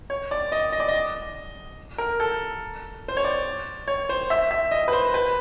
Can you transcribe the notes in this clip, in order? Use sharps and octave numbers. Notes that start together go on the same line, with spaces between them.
C#5
D5
D#5
D#5
D5
D#5
A#4
A4
C5
C#5
D5
C#5
C5
E5
E5
D#5
B4
C5
B4